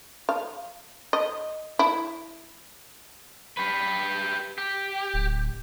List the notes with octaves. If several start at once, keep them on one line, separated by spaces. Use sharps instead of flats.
F5
D#5
E4
G4 B4
G4
D1